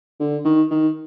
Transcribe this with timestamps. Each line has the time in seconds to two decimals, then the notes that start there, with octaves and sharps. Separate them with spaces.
0.20 D3
0.45 D#3
0.71 D#3